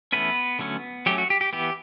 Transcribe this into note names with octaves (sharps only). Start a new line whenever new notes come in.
E3 A3 B3 C#4 B4
D3 F#3 A3 C#4
F#3 A3 C#4 G4
F#4
G4
G4
E3 B3 G4